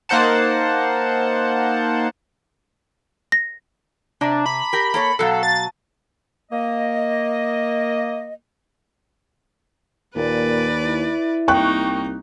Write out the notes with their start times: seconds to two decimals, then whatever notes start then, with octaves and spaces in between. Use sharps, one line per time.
0.09 A#3 D#4 C5 F#5 A5
3.32 A#6
4.21 C3 D4 A5 A#5 D6
4.46 B5
4.73 G4 A#4
4.94 A#3 A4 C#5
5.19 B2 F#3 A4 F5 F#6 C7
5.43 A5 A6
6.52 A#3 D#5
10.16 D#2 A#2 B4 D5
10.85 E4
11.48 C2 A#3 D#4 G5 C#6 F#6